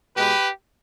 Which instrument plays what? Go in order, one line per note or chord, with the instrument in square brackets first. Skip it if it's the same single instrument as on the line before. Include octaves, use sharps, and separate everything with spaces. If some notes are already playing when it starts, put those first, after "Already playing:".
[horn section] B2 G#3 G4 B4